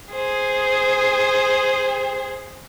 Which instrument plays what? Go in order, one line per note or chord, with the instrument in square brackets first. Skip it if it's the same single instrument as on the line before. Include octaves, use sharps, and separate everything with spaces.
[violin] G#4 C5